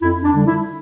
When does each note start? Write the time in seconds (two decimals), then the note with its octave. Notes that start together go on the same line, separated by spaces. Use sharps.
0.01 F2 E4
0.23 D4
0.34 D3 G3
0.46 E4